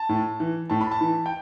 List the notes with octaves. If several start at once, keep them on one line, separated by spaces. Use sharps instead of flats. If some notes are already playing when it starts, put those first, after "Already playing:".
Already playing: A5
A2
E3
A2 A5
B5
A5
E3
G5